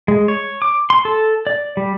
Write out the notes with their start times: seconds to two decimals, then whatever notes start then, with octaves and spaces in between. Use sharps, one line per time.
0.08 G#3
0.28 C#5
0.62 D6
0.90 C6
1.05 A4
1.47 D5
1.77 G3